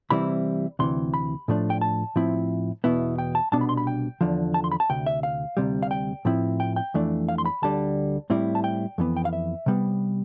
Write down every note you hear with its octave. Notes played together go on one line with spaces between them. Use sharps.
C3 E3 G3 C4 E4 B5
D2 C3 E3 C6
B5
A2 F3 A3 D4
G5
A5
A2 F3 C4 E4
E2 B2 B3 E4
G5
A5
C2 B2 B3 D4 A5
B5
C6
B5
G5
E2 D3 F3
A5
C6
B5
A5
D2 C3 G5
E5
F5
D2 C3 G3
F5
G5
A2 F3 C4 E4
G5
G5
F2 E3 A3 D4
F5
C6
B5
D2 D3 G3 A5
A2 G3 C4 E4
A5
G5
F2 E3 B3
G5
F5
E5
C3 G3 B3